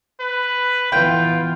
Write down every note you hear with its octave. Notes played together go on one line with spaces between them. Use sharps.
B4
E3 B3 F4 G5